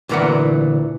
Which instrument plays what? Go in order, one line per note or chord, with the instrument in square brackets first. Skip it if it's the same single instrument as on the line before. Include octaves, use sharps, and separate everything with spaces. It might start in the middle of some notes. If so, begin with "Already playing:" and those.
[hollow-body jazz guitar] D2 A#2 E3 A#4 B4 F#5